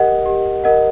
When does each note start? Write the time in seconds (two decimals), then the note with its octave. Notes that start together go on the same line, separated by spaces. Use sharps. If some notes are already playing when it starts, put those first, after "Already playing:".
Already playing: G4 A#4 D#5 F#5
0.26 G4
0.64 A#4 D#5 F#5